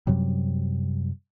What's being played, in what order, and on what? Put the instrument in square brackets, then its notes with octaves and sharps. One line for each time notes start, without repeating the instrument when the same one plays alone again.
[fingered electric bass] F#2 C3 F#3 G3